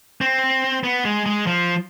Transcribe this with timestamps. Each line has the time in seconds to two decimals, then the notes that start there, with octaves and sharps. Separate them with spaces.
0.21 C4
0.84 B3
1.05 G#3
1.26 G#3
1.47 F3